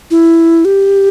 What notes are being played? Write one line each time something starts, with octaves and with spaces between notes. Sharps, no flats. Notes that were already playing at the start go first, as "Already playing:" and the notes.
E4
G4